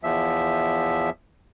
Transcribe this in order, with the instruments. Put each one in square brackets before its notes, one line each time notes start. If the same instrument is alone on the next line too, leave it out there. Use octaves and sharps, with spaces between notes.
[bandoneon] E2 F3 E5